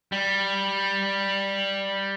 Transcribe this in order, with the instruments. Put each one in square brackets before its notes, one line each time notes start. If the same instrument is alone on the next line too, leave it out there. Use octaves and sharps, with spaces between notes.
[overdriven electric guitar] G3